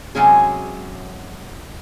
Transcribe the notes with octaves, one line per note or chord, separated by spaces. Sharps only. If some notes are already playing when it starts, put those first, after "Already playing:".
C3 F#3 G#3 C#4 G#4